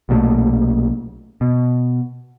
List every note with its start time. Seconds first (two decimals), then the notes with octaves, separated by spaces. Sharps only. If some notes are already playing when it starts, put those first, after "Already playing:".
0.09 B1 A#2 F#3 A3
1.41 B2